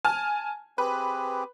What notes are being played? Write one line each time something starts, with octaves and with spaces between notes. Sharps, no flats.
G#5 A5 F6
C4 G4 G#4 B4